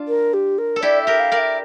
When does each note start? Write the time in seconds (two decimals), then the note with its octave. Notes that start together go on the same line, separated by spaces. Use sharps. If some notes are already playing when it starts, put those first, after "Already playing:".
Already playing: D4 F4
0.08 A#4
0.34 G4
0.58 A#4
0.76 A4
0.82 E4 G4 D5
1.02 E5
1.07 G4 A#4
1.20 F5
1.32 A#4 D5
1.38 E5